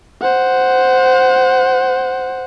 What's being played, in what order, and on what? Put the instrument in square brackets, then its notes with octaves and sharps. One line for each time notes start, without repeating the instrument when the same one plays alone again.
[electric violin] C5 F#5